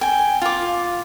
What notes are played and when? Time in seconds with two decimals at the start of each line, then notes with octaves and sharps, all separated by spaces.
0.01 G5 G#5
0.42 F4 D6